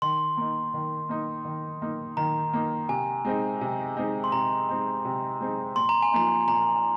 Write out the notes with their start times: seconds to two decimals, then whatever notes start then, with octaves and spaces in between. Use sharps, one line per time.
0.02 D#3 C6
0.37 A#3 D#4
0.74 D#3
1.09 A#3 D#4
1.45 D#3
1.82 A#3 D#4
2.17 D#3 A#5
2.53 A#3 D#4
2.89 C3 G#5
3.25 G#3 C4 D#4
3.61 C3
3.97 G#3 C4 D#4
4.24 C6
4.32 C3 A#5
4.69 G#3 C4 D#4
5.05 C3
5.40 G#3 C4 D#4
5.76 A#2 C6
5.89 A#5
6.03 G#5
6.12 F3 A#3 D#4 A#5
6.48 A#2 A#5